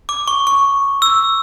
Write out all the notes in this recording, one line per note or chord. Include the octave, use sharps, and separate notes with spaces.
D6
C#6
C#6
E6